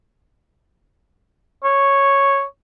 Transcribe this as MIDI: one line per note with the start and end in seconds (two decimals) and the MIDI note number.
1.64 2.42 73